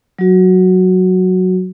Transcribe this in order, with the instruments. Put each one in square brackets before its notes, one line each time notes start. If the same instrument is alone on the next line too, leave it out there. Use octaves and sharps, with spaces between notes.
[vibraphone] F#3 F#4